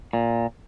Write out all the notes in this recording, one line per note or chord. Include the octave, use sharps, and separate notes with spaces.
A#2